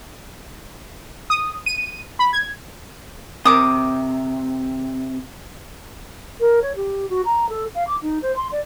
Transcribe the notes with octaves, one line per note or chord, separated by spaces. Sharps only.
D#6
D#7
B5
G#6
C3 A#4 D6 D#6
A#4
C#5
G4
F#4
A#5
A4
F5
D6
D#4
C5
C6
D5